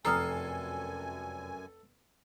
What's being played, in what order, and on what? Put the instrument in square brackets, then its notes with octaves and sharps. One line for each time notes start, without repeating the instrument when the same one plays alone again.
[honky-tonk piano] F1 C7 [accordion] F#2 G#5 [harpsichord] A4 [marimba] A#5 D#6 F6